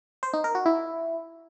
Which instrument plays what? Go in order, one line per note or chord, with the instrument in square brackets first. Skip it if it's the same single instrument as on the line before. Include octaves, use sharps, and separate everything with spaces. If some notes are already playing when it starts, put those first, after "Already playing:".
[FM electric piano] C5
D#4
A#4
F#4
E4